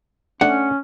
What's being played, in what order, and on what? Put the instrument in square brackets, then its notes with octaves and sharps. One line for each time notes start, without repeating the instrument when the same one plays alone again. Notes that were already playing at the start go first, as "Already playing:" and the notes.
[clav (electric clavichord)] A3 D4 [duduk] C#4 [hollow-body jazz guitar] F#5